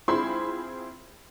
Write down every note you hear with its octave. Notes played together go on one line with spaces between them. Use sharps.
C4 E4 F4 G#4 B5 C6